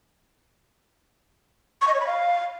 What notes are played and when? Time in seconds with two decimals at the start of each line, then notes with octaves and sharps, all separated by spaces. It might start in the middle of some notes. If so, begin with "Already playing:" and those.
1.81 C#6
1.88 D#5
1.94 C#5
2.00 B5
2.07 F5